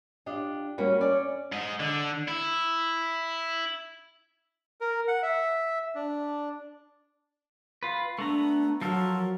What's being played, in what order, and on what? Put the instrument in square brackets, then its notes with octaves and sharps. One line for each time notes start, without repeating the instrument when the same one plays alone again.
[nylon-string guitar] D4 F4 G4 D#5
G3 A#3 C#4 F#4 A#4 B4
C#4 D5
[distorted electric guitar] G#2 D#5
D3
E4
[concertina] A#4
F#5
E5
D4
[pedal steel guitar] F4 B4
[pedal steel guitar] A3 B3 A#5 [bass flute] D4
[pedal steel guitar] F3 A4 A#4 [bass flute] F#3